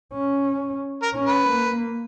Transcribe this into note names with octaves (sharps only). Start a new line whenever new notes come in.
C#4
A#4
C#4
B4
A#3